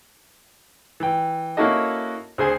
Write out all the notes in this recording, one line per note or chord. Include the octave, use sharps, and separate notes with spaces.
E3 G5
A#3 C#4 E4 F#4 A4 D#5
D2 G#4 C5 G#5